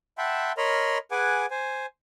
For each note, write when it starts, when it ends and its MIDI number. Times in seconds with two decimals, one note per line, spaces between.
0.18 0.52 76
0.18 0.52 78
0.18 0.52 79
0.18 0.52 81
0.18 0.52 83
0.18 0.52 84
0.57 0.98 70
0.57 0.98 73
0.57 0.98 75
0.57 0.98 83
0.57 0.98 84
0.57 0.98 89
1.11 1.46 68
1.11 1.46 71
1.11 1.46 78
1.11 1.46 80
1.11 1.46 86
1.51 1.86 72
1.51 1.86 80